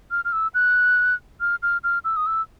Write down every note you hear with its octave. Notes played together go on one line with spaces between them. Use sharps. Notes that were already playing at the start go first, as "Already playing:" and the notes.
F6
F6
E6
F#6
F6
F6
F6
E6
D#6
E6